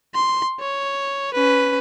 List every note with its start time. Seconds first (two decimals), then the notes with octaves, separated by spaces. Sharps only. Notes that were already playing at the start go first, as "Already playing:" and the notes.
0.14 C6
0.60 C#5
1.34 C#4 B4